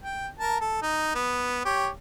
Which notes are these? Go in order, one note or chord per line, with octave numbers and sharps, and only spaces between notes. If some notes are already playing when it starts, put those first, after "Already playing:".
G5
A#4 A5
A4
D#4
B3
G4 C#5